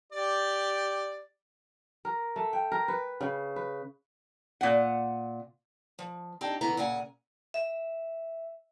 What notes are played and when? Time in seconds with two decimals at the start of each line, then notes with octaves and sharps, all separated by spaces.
0.12 G4 D5
2.05 A#4
2.36 A3
2.53 G5
2.72 A#4
2.88 B4
3.21 C#3
3.56 B4
4.61 A#2 F#5
5.99 F3
6.41 C4 D4 D#4 G4 A5
6.61 D2 A2 C#3 E3 B3 A#5
6.77 A#2 C#3 F#5 G#5
7.54 E5